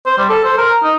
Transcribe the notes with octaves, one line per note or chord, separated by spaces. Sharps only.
C5
G3
A4
C5
A#4
D#4